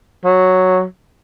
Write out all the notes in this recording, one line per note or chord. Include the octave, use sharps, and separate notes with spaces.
F#3